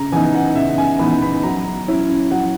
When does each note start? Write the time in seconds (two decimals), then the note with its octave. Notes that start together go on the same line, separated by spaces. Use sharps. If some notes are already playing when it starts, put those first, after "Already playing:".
Already playing: C#3 A#5
0.12 E3 B3 D#4 G#5
0.35 F#5
0.55 C#3 E5
0.78 G#5
0.99 E3 B3 D#4 B5
1.22 B5
1.43 F#3 A#5
1.88 C#4 E4
2.31 F#3 F#5